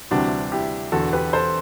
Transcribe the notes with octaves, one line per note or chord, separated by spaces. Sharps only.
D2 C3 E3 G3 D4 F#4
E4 G4
E1 E2 D3 F#4 A4
G4 B4
A4 C5